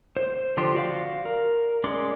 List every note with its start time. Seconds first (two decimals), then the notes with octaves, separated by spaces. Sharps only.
0.17 C5
0.57 D3 F3 D4 G4 C6
0.75 F#4 D5 F5
1.25 A#4
1.84 G#3 C#4 D5 C6 D6